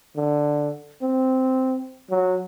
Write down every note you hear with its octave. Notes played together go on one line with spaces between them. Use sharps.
D3
C4
F#3